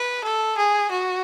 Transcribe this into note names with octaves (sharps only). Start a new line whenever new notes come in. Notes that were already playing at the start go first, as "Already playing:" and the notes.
Already playing: B4
A4
G#4
F#4